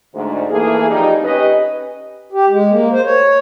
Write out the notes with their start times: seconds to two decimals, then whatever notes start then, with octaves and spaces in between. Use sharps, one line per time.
0.14 D2 G#2
0.49 E3 A3 A#3 G#4
0.89 F2 G3 D#4
1.23 C#4 G4 B4 D#5
2.33 G4
2.49 G#3
2.71 A#3
2.92 C5
3.04 C#5